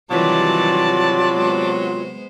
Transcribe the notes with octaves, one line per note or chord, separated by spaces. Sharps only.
C3 D#3 E3 F#3 G3 F4 D5 A5
G#3 B3 C5